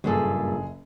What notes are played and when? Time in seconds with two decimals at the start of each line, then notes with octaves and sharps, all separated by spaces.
0.04 F#1 G2 A#2 G#4 A4